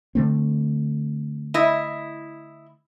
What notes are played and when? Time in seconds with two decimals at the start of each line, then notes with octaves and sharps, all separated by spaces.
0.15 D3 A3 C4
1.54 E4 D#5